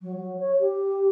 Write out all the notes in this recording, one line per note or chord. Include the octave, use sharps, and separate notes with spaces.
F#3
F#3
C#5
G4